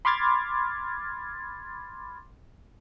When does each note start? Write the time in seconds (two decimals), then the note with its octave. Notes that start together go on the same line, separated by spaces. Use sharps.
0.05 B5 C6 D6 F6 G#6 A6